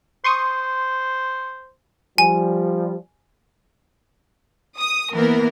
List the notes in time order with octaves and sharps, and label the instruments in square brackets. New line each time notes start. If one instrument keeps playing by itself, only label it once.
[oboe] C5 [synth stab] C6 C#6 D#6
[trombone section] F3 G3 [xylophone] G#5
[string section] D#6
E3 A#3 B3 A#4